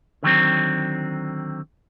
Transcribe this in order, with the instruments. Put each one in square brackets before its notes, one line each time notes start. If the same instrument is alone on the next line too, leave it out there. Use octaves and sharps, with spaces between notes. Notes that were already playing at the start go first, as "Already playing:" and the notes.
[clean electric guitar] D3 D#3 F#3 C4